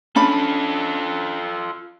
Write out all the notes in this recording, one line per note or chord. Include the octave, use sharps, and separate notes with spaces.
C#4 D4 F4 A4 B5